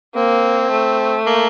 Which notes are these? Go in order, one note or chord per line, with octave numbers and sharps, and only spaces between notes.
A#3 C4
A3
A#3